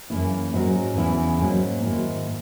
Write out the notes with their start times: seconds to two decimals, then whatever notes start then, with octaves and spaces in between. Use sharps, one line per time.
0.10 F#2 C#3 E3 A#3 E4
0.53 G#2 F#3 C#4 F#4 A#4
0.96 E2 C#3 E3 B3 E4
1.40 G#2 F#3 A#3 C#4
1.83 G#2 D#3 F#3 A#3 E4